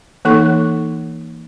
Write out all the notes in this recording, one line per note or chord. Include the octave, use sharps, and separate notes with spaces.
E3 A#3 D#4 A4 C#6